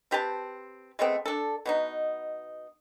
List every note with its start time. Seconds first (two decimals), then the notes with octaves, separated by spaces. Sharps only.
0.11 C4 G4 B4 A5
0.99 G#3 A3 B3 C4
1.26 D4 A4
1.65 B2 B3 D#4